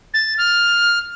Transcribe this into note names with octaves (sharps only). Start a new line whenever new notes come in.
A6
F6